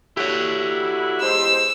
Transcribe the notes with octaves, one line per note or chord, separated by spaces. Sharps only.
D3 E4 F#4 G4 C#5
E2 G#3 C5 E6